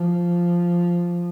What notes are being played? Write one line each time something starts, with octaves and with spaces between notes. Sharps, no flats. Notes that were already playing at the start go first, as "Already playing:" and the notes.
Already playing: F3